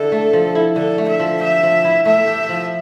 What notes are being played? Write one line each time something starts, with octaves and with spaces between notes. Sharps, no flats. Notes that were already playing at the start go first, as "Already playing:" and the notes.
Already playing: D3 E4 A4
A3
F3
E4
D3 A4
A3
E5
F3
G4 E5
F3
E4
A3 E5
G4
F3